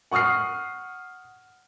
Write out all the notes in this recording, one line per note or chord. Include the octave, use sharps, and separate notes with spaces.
F#5 C#6 D#6 F6 C7